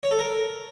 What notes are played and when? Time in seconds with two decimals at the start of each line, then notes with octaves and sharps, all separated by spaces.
0.03 C#5
0.11 A4
0.19 A#4